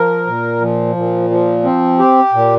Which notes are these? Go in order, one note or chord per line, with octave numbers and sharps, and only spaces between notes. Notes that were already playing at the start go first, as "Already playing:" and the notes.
Already playing: F3 A#4
A#2
F3
A#2
F3
C4
G4
A#2